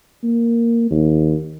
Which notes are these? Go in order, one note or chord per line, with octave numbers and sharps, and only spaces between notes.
A#3
D#2